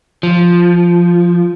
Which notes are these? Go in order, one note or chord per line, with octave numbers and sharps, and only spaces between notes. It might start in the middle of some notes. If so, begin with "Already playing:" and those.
F3